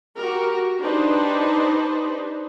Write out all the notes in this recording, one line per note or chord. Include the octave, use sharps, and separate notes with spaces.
F#4 G4 A#4
D4 D#4 G4 B4 C5